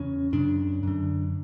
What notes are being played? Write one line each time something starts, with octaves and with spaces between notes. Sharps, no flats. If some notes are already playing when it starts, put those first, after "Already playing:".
Already playing: E2 C#3 C#4
F#2 C#3 D4
F#2 D3